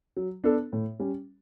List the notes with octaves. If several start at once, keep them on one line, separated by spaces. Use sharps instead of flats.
F#3
B3 D4 A4
A2
G3 C#4